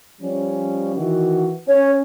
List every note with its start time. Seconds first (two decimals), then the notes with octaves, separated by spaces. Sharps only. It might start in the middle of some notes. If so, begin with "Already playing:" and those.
0.22 F3 G3 C#4
0.96 D#3 E3 F#4
1.68 C#4 C#5